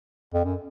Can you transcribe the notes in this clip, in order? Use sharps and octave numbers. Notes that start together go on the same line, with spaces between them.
F2
F#2